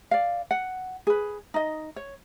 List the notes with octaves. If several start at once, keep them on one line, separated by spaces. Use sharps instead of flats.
D5 F5
F#5
G#4 B4
D#4 D#5
C#5